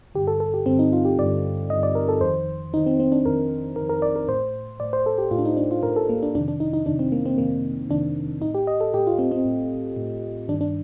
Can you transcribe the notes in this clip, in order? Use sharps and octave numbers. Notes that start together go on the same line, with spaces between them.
G2 D3 G4
A4
A4
G4
G2 D3 C4
D#4
F4
G4
G2 D3 D5
G2 D3 D#5
D5
A#4
A4
F2 D#3 C5
F2 D#3 D#4
C4
C4
D4
F2 D#3 A#4
D#3 A#4
F2
A#4
D5
A#4
A2 C5
A2 D5
C5
A4
G4
A2 F4
D4
D#4
D4
F4
A2 A#4
A4
A#3
D4
F2 C3 D#3 D4
D4
D#4
D#4
F2 C3 D#3 D4
C4
A#3
C4
F2 C3 D#3 A#3
F2 C3 D#3 D4
A2 D#4
G4
D#5
A4
A2 G4
F4
C4
C4
A2
A2
G2 D#3 D4
D4